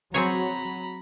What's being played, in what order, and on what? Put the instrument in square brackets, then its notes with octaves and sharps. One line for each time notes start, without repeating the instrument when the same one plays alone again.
[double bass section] F#3 [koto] C4 G#4 C#5 [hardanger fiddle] A#5 B5